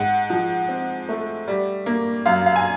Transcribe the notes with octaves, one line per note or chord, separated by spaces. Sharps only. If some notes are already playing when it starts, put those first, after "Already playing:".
Already playing: G#2 F#5
F3
C4
A3
G3
A#3
F#2 F5
F5
G#5